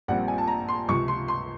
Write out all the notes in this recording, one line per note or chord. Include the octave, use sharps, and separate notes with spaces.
A#1 A#2 G3 C4 F#5
G#5
A5
A#5
C6
C#2 C3 F3 C#6
C6
C6